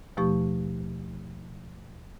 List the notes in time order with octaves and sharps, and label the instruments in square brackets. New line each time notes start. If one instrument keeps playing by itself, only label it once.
[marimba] D#2 B2 F3 A3 G4 C#6